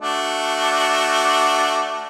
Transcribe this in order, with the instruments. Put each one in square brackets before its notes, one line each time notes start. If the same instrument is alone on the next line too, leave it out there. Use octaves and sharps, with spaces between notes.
[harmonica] A3 D4 F#4